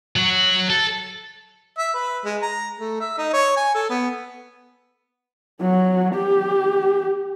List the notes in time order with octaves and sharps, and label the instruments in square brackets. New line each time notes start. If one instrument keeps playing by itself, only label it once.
[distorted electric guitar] F#3 F#4
A4
[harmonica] E5
B4
G#3
A#5
A3
E5
D#4
C#5
G#5
A4
B3
[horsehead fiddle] F#3
G4